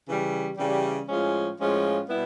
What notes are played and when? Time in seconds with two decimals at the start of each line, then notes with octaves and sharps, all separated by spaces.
0.07 C#3 E3 G3
0.58 C#3 E3 G3
1.09 A2 F3 G#3 C#4 F4
1.58 A2 F3 G#3 C#4 F4
2.09 B2 G3 B3 E4